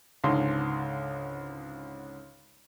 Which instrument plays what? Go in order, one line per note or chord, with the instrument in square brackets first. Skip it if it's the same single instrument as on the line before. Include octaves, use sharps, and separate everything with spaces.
[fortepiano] C#2 G#2 D3 C6